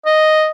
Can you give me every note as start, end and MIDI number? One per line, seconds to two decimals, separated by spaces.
0.06 0.50 75